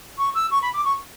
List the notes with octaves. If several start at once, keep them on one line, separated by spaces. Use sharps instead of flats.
C#6
E6
C#6
B5
D6
C#6